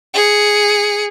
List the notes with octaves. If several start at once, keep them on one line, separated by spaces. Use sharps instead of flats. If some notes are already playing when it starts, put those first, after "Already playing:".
G#4 C#7